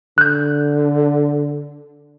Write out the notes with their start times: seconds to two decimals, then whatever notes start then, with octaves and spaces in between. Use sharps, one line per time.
0.18 D3 F#6 G6